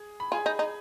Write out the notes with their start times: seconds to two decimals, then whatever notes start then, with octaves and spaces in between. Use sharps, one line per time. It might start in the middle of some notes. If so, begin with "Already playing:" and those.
Already playing: G#4
0.20 B5
0.32 F4 G#4 G#5
0.46 D#4
0.59 D#4